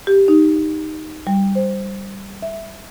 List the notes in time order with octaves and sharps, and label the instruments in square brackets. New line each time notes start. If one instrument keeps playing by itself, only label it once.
[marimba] G4
D#4
G3
C5
E5